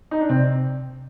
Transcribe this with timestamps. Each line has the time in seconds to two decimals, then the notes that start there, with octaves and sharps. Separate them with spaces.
0.11 D#4
0.20 D4
0.29 C3 C4